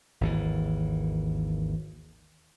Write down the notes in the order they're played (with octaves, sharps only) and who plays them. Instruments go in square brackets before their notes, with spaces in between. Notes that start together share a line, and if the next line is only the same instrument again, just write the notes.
[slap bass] G#1 D#2 E3